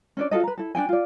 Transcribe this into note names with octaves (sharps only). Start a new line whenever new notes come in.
C#4 D4 D5
F4 F#4 A4 D#5
B4 A#5
E4 A4
D4 D#4 G5 G#5
F4 D5